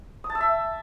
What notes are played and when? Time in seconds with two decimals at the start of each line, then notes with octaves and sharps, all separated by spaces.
0.24 D#6
0.30 A5
0.35 E6
0.40 E5